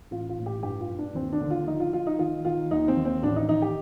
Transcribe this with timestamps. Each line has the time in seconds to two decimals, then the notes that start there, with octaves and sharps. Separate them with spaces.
0.11 A1 F4
0.29 F4
0.38 A2
0.46 G4
0.63 G2 G4
0.81 F4
0.90 G2
0.99 D4
1.15 D#2 C4
1.32 D4
1.41 D3
1.50 F4
1.67 F3 D#4
1.80 F4
1.93 F3 F4
2.07 D#4
2.19 D#3 F4
2.45 D#3 F4
2.71 D#2 D#4
2.88 C4
2.97 D#2
3.05 C4
3.22 A1 D4
3.36 D#4
3.49 D#3 D#4
3.62 G4